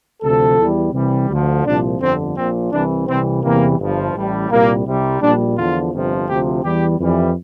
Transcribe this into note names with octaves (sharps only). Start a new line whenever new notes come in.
D2 C3 F3 A4
E2 E3 G3
C2 C3 E3 G3
D2 D3 F3
C2 A#2 F3 D4
G1 F2 D3 C4
A#1 A#2 F3 C4
C2 C3 E3 D4
C2 C3 E3 G3 C4
E2 C3 E3 G3 A#3
G1 G2 F3
A1 A2 G3
C2 A#2 G3 A#3
C2 C3 G3
A#1 A#2 G3 D4
E2 D3 F3 F4
G1 F2 C3 F3
D2 C3 F3 G4
E2 E3 G3 G4
F2 E3 G3